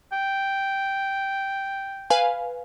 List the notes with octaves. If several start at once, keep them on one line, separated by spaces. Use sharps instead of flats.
G5
B4 F5 G#5